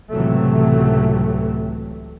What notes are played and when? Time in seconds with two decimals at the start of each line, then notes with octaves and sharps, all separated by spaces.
0.12 C#2 A2 C3 E3 F#3 A3